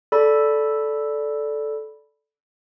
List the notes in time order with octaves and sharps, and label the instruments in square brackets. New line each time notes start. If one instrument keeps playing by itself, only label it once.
[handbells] A4 D5 B5